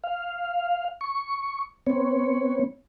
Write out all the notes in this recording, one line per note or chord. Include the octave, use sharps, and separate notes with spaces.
F5
C#6
B3 C4 C#5